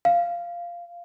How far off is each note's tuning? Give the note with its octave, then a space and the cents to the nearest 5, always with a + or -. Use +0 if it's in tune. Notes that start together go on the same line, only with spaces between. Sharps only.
F5 -10